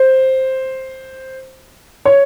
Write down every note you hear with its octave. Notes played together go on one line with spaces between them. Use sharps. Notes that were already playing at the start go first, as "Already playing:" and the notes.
Already playing: C5
C#5